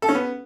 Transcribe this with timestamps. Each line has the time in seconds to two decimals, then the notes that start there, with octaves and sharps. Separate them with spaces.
0.02 A4
0.09 C#4
0.15 B3